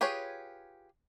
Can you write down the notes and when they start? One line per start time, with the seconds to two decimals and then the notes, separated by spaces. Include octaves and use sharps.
0.01 F4 G4 G#4 B4 C#5